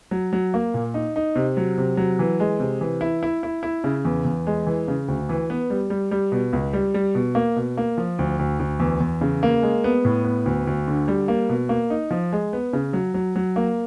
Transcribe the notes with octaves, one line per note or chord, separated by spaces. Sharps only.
F#3
F#3
A#3
A#2
D#4
D#4
C3
F#3
C3
F#3
E3
G#3
C3
E3
E4
E4
E4
E4
C#3
E2
E2
G#3
E3
C#3
D2
E3
B3
G3
G3
G3
B2
C#2
G3
G3
B2
A#3
B2
A#3
F3
D2
D2
D2
E2
E2
C#3
A#3
G#3
B3
A2
B3
D2
D2
D3
G3
A#3
B2
A#3
D#4
F3
G#3
B3
C#3
F#3
F#3
F#3
A#3